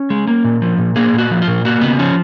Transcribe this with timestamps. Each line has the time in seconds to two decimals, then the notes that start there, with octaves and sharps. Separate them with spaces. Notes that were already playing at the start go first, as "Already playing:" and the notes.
Already playing: C#4
0.10 G#3
0.28 A#3
0.44 A#2
0.62 F3
0.78 A#2
0.96 A#3 G#4
1.13 A#2
1.18 F#4
1.31 F3
1.42 F4
1.48 A#2
1.65 A#3 F#4
1.81 C#3 B3
1.99 F3 C#4